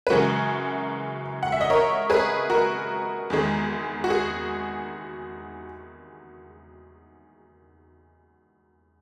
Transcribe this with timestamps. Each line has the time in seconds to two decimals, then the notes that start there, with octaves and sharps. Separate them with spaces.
0.07 B4
0.10 F#2 C#3 E3 G#3 F#4 A#4
1.43 F#5
1.52 E5
1.61 D#5
1.70 A#4 C#5
2.10 G#4 B4
2.50 F#4 A#4
3.30 E2 D#3 G#3
4.04 F#4
4.10 G#4